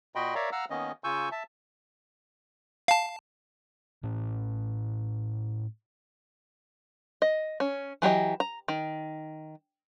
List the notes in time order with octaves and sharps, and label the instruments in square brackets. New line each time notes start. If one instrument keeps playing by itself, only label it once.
[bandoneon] A#2 F#4 D#5 G5 B5 C6
A#4 C#5 D5 E5 F5 A#5
F5 F#5 A#5 E6 F6
D#3 A#3 B3 C#4 D#5
C#3 F4 G#5 C#6 E6 G6
E5 A5
[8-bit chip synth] F5 A5
[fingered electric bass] A2 C#4
[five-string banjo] D#5
C#4
E3 F#3 G4 D#5
A#5
D#3